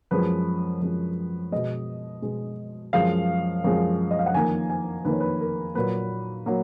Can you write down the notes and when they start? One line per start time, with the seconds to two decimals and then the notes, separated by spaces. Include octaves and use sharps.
0.11 F#2 F3 G#3 B4
0.82 F#2 F3 G#3
1.52 B2 G#3 D#5
2.22 B2 G#3
2.93 F#2 F3 G#3 F5
3.64 F#2 F3 G#3
4.11 D#5
4.19 F5
4.26 F#5
4.34 F2 D#3 A#3 G#5
4.70 G#5
5.05 F2 D#3 A#3 B4
5.13 C#5
5.20 B4
5.40 A#4
5.75 A#2 F#3 A#3 B4
6.46 F#3 A#3